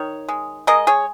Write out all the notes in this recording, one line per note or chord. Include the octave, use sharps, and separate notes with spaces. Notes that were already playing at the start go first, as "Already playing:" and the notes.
Already playing: D#3 C#5
G#3
G#3 A#4 D#5
G#4 C#5